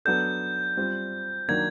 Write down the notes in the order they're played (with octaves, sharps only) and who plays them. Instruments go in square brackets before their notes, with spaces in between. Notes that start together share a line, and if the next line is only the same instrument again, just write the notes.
[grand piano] F#3 B3 D4 F#4 A4 [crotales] G6
[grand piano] G3 C4 F4
[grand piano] D#3 F#3 A#3 D4 F#4 [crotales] G#6